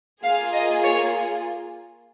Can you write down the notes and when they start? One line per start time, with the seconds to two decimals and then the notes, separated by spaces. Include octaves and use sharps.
0.23 A#3 F4 G#4 F5
0.53 D#5
0.83 C#5